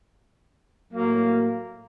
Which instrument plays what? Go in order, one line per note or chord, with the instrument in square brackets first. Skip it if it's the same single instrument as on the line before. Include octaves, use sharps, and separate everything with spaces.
[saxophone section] A2 F#3 A#3